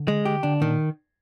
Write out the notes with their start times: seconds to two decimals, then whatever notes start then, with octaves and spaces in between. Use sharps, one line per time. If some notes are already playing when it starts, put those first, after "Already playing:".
Already playing: D3
0.08 G#3
0.25 G4
0.43 D3 D4
0.61 A#2 D#3